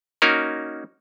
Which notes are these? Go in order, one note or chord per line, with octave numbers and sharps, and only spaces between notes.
A#3 C#4 D#4 F#4 A#4